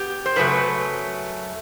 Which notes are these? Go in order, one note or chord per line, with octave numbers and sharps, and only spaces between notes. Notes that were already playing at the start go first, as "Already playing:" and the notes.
Already playing: B3 G4
C5
F#2 C#3 F#3 A3 B4